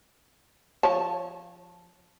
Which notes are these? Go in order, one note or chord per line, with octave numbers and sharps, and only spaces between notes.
F3 C#5 A5